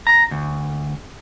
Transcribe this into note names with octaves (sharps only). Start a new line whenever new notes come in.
A#5
D2